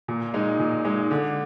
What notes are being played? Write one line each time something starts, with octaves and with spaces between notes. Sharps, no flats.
A#2
G#3 D#4
A#2
G#3 D#4
D3